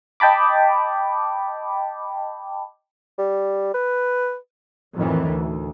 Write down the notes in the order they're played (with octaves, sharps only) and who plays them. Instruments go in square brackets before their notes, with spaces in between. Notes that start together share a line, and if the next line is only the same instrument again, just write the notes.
[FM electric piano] D#5 G5 A5 B5 D6
[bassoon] G3
B4
[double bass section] F2 A2 D#3 E3
D2